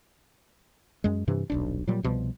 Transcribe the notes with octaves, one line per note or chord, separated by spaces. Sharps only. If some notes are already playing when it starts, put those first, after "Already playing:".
F#2 G#3
G2 C3 E3
D#1 B1 D4
A#2 F#3 G3
C2 B2 F3 G3